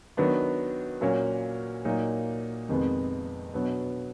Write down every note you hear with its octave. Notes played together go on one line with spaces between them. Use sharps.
D#3 F#3 B3 D4
A#2 F#3 A#3 C#4
A#2 F#3 A#3 D#4
F2 C3 D#3 G#3 B3
B2 F#3 B3 D4